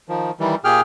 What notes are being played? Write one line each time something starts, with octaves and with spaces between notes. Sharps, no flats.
D#3 F3
D#3 E3 G3
A#2 G4 G#4 G5 F6